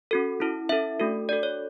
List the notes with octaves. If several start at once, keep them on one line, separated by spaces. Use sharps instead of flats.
C#4 F#4 A4
C#4 E4 A4
C#4 E4 A4 E5
A3 D4 F#4 A4
D4 F#4 A4 D5
C#5